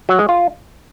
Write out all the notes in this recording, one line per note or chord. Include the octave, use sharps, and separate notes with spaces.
F#3
G#3
F4